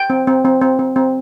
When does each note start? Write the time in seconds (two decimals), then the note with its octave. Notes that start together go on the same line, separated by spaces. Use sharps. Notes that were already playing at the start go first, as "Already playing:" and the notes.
Already playing: G5
0.10 C4
0.27 C4
0.45 C4
0.61 C4
0.79 C4
0.96 C4